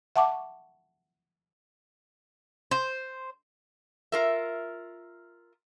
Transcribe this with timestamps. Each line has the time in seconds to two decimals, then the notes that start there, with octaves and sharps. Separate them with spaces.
0.16 E5 F#5 A5 C#6 D6
2.71 C5
4.12 F4 A#4 E5